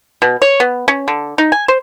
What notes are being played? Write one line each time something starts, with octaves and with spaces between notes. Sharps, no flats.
B2
C#5
B3
C#4
D3
D#4
G#5
C5